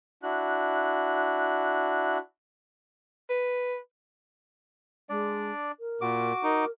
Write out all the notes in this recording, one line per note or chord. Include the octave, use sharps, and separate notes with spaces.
D4 E4 F#4 F#6
B4
G#3 D4 D5
A#4
A#2 F#4 D6
D#4 A#4